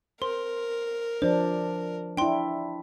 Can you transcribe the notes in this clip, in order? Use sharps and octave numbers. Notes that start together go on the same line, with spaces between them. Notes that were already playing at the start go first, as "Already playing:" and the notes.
A#4 C5 C6
F3 D4 C5
D4 E4 G5 C6